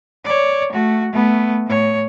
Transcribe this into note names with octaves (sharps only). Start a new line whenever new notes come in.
C#5 D5
A3 F#4
A3 B3
A2 C#5